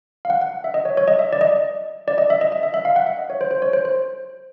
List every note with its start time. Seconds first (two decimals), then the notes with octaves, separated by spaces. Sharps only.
0.25 F5
0.30 F#5
0.41 F#5
0.64 E5
0.74 D#5
0.85 C#5
0.97 C#5
1.08 D#5
1.19 E5
1.33 D5
1.41 D#5
2.08 D5
2.18 D#5
2.30 E5
2.41 D#5
2.52 D#5
2.63 E5
2.74 E5
2.85 F5
2.96 F#5
3.06 E5
3.19 D#5
3.30 C#5
3.41 C5
3.51 C5
3.62 C#5
3.73 C5
3.85 C5